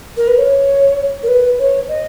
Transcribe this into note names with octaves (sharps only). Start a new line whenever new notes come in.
A#4
B4
C#5
A#4
B4
C#5
D#5